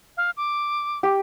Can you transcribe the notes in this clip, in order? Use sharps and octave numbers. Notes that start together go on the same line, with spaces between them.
F5
D6
G4